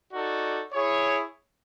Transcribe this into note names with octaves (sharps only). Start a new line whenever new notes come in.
D#4 F#4 A4 D5
E4 G#4 C#5